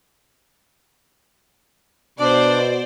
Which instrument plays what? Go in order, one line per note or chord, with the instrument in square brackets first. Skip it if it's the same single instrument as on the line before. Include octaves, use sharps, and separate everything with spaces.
[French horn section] B2 [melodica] D4 [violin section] C5 D5